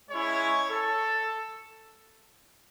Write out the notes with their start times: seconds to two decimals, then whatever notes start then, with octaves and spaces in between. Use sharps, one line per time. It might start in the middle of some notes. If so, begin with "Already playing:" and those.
0.10 G#3 C#4 E4 C#5
0.70 A4